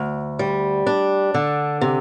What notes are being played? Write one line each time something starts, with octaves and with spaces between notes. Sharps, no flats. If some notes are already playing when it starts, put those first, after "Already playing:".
Already playing: D2
G3
D4
D3
C3